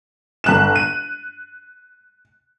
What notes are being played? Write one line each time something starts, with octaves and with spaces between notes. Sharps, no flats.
G1 F#6 E7
D#7